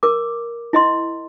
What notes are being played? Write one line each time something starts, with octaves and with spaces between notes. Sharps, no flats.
A#4 D6
E4 D#5 C6